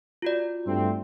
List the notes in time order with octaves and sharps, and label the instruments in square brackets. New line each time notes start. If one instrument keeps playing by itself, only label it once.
[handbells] F4 F#4 D5
[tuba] G2 [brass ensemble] A3 C4